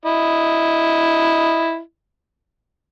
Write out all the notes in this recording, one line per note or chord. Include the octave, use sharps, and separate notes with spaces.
E4 D#5